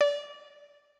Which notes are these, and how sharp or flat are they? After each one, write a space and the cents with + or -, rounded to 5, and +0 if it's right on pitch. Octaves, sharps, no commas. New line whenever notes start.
D5 -25